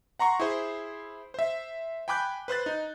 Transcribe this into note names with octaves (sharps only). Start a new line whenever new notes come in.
F#5 A#5 C6 C#6
E4 G#4 C5
C5 E5
G5 G#5 B5 D6 F#6 G6
B4 C5 F#6 A6
D#4